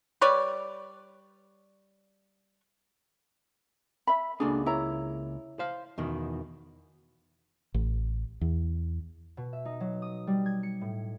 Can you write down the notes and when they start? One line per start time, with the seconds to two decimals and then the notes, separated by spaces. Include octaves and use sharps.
0.21 G3 B4 C#5 D5
4.07 E5 B5
4.40 C#2 A#3 D4 F#4 G#4 A4
4.66 E4 C#5 A#5
5.59 C5 F5
5.98 E2 B2 D#3
7.74 A1
8.41 E2
9.37 B2
9.53 E5
9.65 D#4
9.80 F#3
10.02 D#6
10.27 G3
10.46 G#6
10.63 C#7
10.81 A2